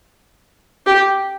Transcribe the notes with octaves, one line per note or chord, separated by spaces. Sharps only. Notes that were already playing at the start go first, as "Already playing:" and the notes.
G4